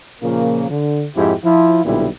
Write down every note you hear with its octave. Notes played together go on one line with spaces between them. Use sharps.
A#2 C#3 F3 A#3
D3
F2 G#2 D#4 E4 G4
F3 E4 F4
B1 A#2 D3 G3 B3 E4